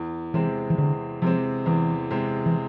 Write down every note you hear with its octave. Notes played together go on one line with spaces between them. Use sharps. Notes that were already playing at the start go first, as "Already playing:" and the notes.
Already playing: E2
C3 E3 G#3 C4
E3
E2 D3
C3 F3 G#3 C4
E2 E3
C3 G#3 C4
E3